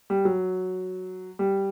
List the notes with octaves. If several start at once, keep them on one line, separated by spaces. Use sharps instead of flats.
G3
F#3
G3